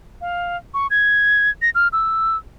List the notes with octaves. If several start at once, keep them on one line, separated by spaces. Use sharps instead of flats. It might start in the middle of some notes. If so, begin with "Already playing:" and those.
F5
C#6
G#6
A#6
F6
E6